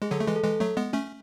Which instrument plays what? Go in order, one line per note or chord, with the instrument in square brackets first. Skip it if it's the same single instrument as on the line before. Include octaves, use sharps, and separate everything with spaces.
[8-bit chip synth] G#3 [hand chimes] G#4
[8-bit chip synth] D3 F#3 [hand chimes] A4
[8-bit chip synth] A3
E3 G#3
[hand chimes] A4
[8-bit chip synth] E3 G#3
F#3 A3
G#3 B3
A3 C#4